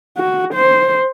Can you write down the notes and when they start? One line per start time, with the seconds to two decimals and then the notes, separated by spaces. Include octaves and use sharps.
0.17 F#4
0.54 C5